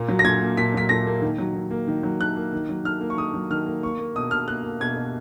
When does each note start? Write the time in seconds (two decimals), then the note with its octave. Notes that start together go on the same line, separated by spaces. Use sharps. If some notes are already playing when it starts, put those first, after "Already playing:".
Already playing: A#2 A#3
0.08 F#3
0.19 A#6
0.24 A#2 G#6
0.41 A#3
0.57 A#2 B6
0.74 F#3 B6
0.89 A#2 A#6
1.07 A#3
1.22 D#3
1.38 F#3
1.55 D#3
1.71 A#3
1.87 D#3
2.03 F#3
2.21 D#3 F#6
2.36 A#3
2.53 D#3
2.69 F#3
2.85 D#3 F6
3.01 A#3
3.10 C#6
3.17 D#3 D#6
3.34 F#3
3.50 D#3 F6
3.66 A#3
3.83 A#3 C#6
3.99 A#3
4.15 B2 D#6
4.31 B2 F6
4.47 A#3 F#6
4.64 A#3
4.80 B2 G#6
4.96 B2